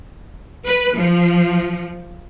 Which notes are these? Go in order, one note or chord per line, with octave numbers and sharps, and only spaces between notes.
B4
F3